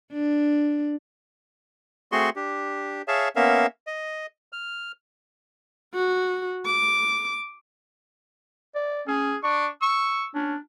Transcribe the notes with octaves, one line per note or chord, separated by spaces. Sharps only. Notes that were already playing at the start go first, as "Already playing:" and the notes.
D4
A3 C4 F#4 G#4 C6 C#6
D4 G4
G#4 C#5 E5 F5 A5
A#3 B3 C#4 A#4 E5 F5
D#5
F6
F#4
D6
D5
C#4 G#4
D4 C#6
C#6 E6
C#4 D4